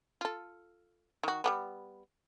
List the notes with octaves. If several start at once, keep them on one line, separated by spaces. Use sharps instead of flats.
F4 A4
D#3 F#4
G3 A#3 B3